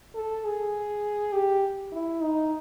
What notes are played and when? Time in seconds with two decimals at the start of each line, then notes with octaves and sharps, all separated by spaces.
0.15 A4
0.45 G#4
1.33 G4
1.92 E4
2.21 D#4